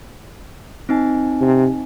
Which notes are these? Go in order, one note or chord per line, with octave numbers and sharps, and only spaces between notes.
C4 D#4 G#5
C3